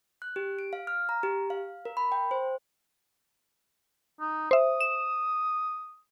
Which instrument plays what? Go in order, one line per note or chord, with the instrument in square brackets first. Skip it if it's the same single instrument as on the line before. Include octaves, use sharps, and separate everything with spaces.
[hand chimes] F#6
G4
D7
F5
F6
A#5
G4
F5
A#4
B5
G5
C5
[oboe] D#4
[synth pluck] C5 E5 [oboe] D#6
[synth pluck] E7